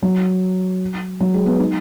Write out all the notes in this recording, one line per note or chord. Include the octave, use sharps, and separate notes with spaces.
F#3
F#3
G#3
B3
D#4